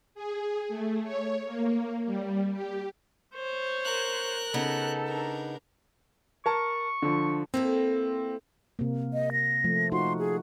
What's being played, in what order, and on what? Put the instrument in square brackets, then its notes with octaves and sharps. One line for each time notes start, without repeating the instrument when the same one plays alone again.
[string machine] G#4
A3
C#5
A#3
G3
G4
[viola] C5 C#5
[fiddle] A#4 F#6
[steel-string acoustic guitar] C#3 B3 D#4 [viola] A4
[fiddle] D4 A#4
[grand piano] A#4 A5 [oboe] C#6
[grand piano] D3 F3
[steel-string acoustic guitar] A#3 E4 A4 [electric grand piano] C4
[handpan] C3 A#3
[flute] D#5
A#6
[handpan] F3 A3
[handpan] D#4 F4 F#4 [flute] C6
[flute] G#4